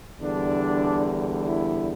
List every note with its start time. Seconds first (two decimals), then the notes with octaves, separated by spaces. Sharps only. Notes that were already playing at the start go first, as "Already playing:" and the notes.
0.20 E2 D3 G3 D4
1.45 E4